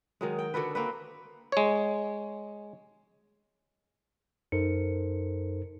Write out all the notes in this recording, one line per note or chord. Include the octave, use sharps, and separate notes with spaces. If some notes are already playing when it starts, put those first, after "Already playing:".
D#3 F#3 G#3
G5
D3 F#4 A4 B4
A#3 C4 B4
G#3 C#5
F#2 D#4 A4 A#4 C5 C#7